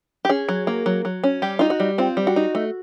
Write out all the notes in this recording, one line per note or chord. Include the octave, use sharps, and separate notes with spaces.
G4
C#4 G#4
F#3
A#3
F#3
F#3
C#4
G3 G4
D#4 F4
F#4
G3
C4 F4
G3
F#4
D#4
A3